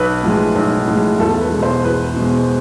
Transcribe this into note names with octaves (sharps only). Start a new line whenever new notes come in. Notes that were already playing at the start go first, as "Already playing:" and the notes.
Already playing: B1 B4
A2 F3 G#3
B1
A2 F3 G#3
E2 A4
B4
B2 G#3
C5
E2 B4
B2 G#3